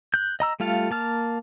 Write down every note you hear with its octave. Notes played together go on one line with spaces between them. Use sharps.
F#6 G6
D#5 A#5 E6
G3 A3 F4 A4 F5
A#3 A5 F6